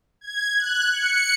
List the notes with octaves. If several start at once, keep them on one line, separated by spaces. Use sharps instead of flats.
G#6
F#6
C#7